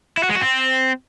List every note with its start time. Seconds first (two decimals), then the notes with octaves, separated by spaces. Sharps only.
0.17 E4
0.23 F#4
0.29 G#3
0.35 F#4
0.41 C4